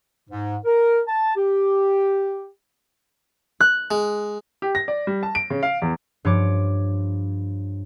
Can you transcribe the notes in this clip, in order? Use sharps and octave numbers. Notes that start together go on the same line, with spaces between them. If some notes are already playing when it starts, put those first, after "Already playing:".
G#2
A#4
A5
G4
F#6
G#3
G4
A#6
D5
G3
A5
D7
C#3
F5
E2
G2 F3 C#5 D6